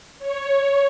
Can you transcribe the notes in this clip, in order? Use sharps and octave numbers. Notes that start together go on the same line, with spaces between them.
C#5